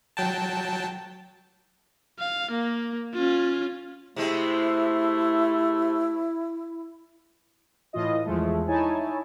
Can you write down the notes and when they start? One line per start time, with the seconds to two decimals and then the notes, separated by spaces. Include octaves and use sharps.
0.17 F#3 G5 A5
2.19 F5
2.51 A#3
3.14 C#4 F4
4.16 C3 G#3 A3 C4 E4
7.93 A2 E3 F4 D#5
8.25 E2 F3 G#3 A3
8.68 D#4 E4 C#5 G#5 A5